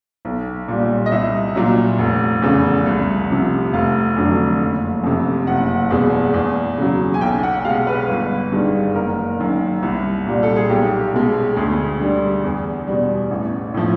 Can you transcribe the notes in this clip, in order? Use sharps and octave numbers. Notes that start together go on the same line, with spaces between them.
B1
A#2 G3
D#5
C2 E5
A#2 F#3
F1
E2 C#3
C2
C3 F3
F1 F5
F2 D3 F#3
F#1
F2 C3
F#1 F#5
E2 B2 G#3
E2
C#3 F#3
G#5
B1 G5
F#5
B2 G#3 F5
B4
G1
G2 D#3 G#3
F#1 A#4
F#2 D#3
C2
A#2 G3
A4
G#4
B1 G4
B2 G#3
D2 G#4
D3 G3
E2
B2 G3
A1
A2 F3